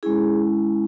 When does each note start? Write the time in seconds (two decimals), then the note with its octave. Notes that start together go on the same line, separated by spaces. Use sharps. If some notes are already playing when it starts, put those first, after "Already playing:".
0.03 G#3 C#4 E4 G#4